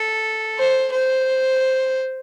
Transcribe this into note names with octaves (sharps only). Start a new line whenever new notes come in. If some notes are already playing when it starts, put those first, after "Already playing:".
Already playing: A4
C5
C5